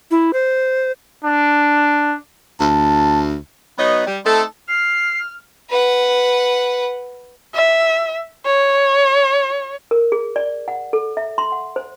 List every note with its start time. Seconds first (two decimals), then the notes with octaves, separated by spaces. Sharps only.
0.11 E4
0.33 C5
1.25 D4
2.60 D2 A5
3.79 F#3 B3 D#4 B4 C#5 D#5
4.07 G3
4.26 A3 C4 D#4 A4
4.68 F6 C7
5.70 B4 F#5
7.55 E5
8.46 C#5
9.91 A#4
10.12 G#4
10.36 D5
10.68 F#5
10.93 A4
11.17 E5
11.38 C6
11.52 F#5
11.76 C5